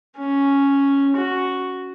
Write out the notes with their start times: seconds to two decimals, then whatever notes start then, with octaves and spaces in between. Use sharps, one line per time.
0.18 C#4
1.16 F#4